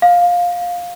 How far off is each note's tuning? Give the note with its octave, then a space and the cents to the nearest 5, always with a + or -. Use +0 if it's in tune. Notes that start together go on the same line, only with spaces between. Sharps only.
F5 +15